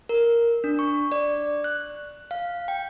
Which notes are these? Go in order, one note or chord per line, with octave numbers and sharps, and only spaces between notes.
A#4
D4
C#6
D5
F#6
F5
G5